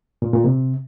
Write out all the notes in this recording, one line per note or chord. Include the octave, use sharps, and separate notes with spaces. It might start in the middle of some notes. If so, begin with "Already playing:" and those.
A#2
A#2
C3